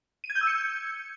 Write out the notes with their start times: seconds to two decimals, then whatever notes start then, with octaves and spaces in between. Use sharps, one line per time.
0.24 D#7
0.30 G#6
0.35 G6
0.41 E6
0.47 C#7